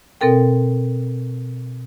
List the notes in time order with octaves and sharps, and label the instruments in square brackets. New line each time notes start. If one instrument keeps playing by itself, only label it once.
[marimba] B2 C4 A4 A#4 G5